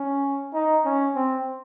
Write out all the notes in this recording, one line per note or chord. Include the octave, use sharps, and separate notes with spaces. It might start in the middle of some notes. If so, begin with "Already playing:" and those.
Already playing: C#4
D#4
C#4
C4